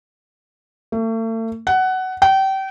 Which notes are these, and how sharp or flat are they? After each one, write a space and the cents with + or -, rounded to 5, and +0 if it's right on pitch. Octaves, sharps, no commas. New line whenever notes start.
A3 +40
F#5 +15
G5 -30